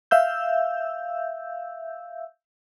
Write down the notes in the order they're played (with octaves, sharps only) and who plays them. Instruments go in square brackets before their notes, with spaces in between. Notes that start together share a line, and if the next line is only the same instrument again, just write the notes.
[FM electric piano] E5 F5 E6 G6